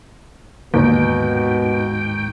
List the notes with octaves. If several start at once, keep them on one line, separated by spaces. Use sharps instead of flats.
D#2 G#2 B2 D3 D#3 A#3 G5